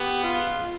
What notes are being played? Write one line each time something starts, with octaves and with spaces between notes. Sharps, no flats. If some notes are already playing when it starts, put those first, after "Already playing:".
Already playing: B3 G4
F4